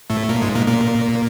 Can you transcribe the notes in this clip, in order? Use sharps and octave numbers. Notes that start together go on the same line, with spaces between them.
A2 A3
A#2 A#3
G#2 G#3
A#2 A#3
A#2 A#3